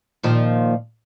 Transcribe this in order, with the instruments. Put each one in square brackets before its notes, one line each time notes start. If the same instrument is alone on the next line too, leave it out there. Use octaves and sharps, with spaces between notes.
[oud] A#2 D#3 F3